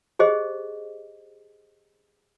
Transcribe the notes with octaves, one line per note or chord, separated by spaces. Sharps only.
G4 G#4 C5 D#5